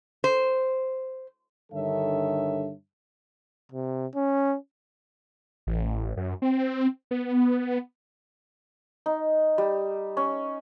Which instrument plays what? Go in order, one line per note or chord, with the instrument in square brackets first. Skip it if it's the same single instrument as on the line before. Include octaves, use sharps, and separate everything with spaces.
[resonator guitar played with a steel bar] C5
[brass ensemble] G2 D3 D#3 A4 C#5 E5
[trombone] C3
C#4
[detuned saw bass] A1
F#2
C4
B3
[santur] D#4
G3
C#4